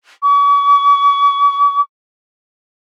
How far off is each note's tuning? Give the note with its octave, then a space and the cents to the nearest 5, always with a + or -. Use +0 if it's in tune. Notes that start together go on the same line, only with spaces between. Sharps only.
C#6 +45